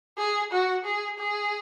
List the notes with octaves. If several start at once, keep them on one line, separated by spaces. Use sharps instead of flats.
G#4
F#4
G#4
G#4